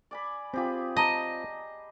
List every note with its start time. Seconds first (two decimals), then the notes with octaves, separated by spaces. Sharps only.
0.11 D5 G#5 B5
0.53 C4 F4 G4 G#4 B5
0.96 D#5 A5 A#5